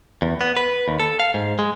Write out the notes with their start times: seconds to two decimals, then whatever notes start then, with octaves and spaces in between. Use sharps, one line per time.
0.22 E2
0.41 B3
0.57 B4
0.88 D#2
1.00 A4
1.20 F5
1.34 G#2
1.59 G#3